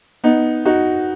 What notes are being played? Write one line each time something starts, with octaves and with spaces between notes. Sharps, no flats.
B3 D#4
D#4 F#4